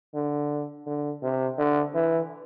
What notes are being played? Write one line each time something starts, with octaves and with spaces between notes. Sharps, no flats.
D3
D3
C3
D3
E3